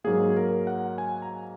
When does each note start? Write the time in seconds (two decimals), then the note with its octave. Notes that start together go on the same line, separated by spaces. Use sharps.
0.04 G#2 F#3 A#3 G#4
0.37 A#4
0.67 F#5
0.98 G#5
1.22 A#5